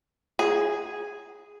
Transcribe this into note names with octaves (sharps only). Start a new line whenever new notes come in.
G#4